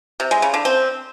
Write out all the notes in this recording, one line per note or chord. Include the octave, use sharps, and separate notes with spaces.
C3
G#3
C#3
D3
C4